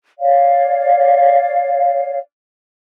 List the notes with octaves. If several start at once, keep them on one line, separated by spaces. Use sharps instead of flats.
C#5 D5 F5